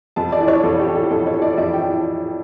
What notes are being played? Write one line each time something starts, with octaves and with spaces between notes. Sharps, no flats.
F2 A5
D5
E3
C#5
F2 A4
G4
E3
A4
F2 A4
C#5
E3
D5
F2 E5
G5
E3